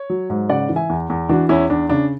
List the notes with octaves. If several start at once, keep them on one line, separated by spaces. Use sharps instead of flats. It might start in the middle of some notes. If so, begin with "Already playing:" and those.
Already playing: C#5
F#3
G#2
C#3 D5 F#5
E3
E5 G#5
E2
E2
E3 D4 F#4
E2 C#4 E4
E2 D4
C#3 D4